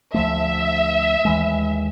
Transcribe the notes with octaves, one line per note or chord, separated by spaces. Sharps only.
D2 F3 A3 E5
D#2 E3 G#3